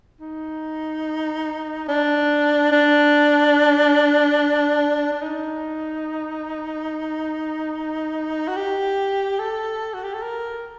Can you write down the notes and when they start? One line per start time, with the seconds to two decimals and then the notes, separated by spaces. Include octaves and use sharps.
0.21 D#4
1.88 D4
2.72 D4
5.12 D4
5.22 D#4
8.48 F#4
8.57 G4
9.39 A4
9.94 F#4
10.03 G4
10.14 A4
10.23 A#4